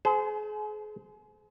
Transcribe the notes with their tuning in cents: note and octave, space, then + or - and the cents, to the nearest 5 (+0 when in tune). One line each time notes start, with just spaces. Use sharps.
G#4 +35 C5 -25